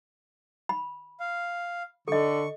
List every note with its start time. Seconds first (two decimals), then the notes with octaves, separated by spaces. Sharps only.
0.69 B5
1.20 F5
2.08 D3 A4 D#5 C#6